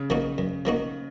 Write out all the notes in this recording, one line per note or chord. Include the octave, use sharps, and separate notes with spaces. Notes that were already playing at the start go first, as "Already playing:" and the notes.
Already playing: C#3
F3 A#3 D#4 F#4
F#2
F3 A#3 D#4 F#4